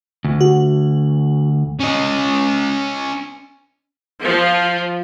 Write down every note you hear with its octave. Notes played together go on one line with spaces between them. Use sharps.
D2
F#4
C#4 D#5
F3